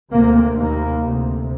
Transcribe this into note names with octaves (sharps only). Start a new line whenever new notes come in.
D2 C3 A#3
D#2 A#3
D2 C3